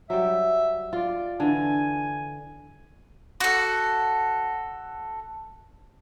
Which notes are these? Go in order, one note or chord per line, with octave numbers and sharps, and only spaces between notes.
F#3 G3 E5
F4 D5
D3 E3 G#5
F#4 A4